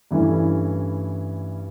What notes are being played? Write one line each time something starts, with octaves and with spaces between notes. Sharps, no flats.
G2 E3 A3 C#4 E4